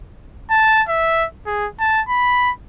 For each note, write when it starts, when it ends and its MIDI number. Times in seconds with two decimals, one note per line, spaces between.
0.51 0.83 81
0.89 1.26 76
1.47 1.68 68
1.80 2.01 81
2.09 2.51 83